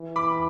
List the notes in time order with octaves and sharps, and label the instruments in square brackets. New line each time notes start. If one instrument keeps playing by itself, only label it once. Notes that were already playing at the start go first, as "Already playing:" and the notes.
Already playing: [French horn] E3
[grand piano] B5 D6